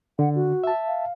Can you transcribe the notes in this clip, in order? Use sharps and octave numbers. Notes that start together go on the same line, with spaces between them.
D3 F#5
F#4
E5 A5
F5